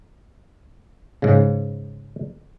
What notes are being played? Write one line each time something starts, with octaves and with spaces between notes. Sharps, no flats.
G#2 C#3